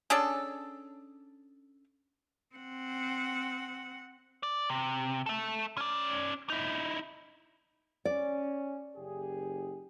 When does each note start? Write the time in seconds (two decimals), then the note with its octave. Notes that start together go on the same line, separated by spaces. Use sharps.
0.10 C#4 D4 G#4 A4
2.55 C4 F#5
4.43 D5
4.70 C3
5.26 A4 E5
5.77 C#4 D5
6.50 D#4 E4
8.05 C#4 D5
8.96 F#1 G4 G#4